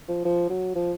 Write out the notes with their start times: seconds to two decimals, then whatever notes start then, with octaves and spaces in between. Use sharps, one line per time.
0.08 F3
0.25 F3
0.49 F#3
0.75 F3